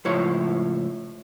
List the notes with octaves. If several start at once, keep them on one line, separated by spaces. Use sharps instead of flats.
C#2 A2 F3 E4 C#5